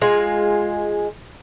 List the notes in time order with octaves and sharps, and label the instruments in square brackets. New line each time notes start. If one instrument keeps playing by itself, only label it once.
[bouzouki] G#3 F4